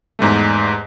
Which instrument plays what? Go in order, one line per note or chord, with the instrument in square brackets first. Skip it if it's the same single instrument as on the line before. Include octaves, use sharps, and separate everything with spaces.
[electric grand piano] E2 G#2 G3 A3